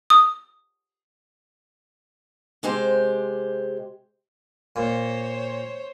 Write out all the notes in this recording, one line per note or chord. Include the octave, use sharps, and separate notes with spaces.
D#6
C3 G#3 G4 C5
A#2 C5 C#5